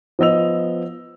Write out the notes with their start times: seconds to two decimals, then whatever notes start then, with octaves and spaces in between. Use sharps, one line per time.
0.19 F3 B3 D#5 E6 F7